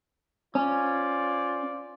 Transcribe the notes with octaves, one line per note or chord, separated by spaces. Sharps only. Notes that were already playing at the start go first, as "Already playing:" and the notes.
C#4 F4 C5 D5